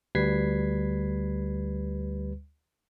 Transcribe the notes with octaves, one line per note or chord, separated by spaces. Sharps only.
D2 G3 B4 G#6 B6 C7